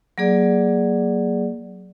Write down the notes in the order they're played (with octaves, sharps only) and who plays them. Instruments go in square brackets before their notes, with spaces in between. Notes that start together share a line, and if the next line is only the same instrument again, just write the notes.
[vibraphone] F#3 A#3 G#4 D5